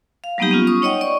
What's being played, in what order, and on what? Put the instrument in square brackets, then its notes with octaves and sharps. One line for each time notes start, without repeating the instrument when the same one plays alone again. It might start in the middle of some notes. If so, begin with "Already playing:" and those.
[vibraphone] F5
F#3 G3 A#3 B3 D#4 G4
B3 C#4 F4
C#4 C#6 D#6
D#4 C#5 D#5 F#5 G5
D5 D#5 C#6